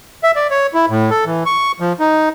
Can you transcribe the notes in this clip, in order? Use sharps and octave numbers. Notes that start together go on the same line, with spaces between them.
E5
D5
C#5
E4
A2
A4
E3
C#6
F3
D#4